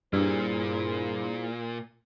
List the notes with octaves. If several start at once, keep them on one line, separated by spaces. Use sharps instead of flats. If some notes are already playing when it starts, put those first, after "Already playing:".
G2 A#2 E4 G#4 C5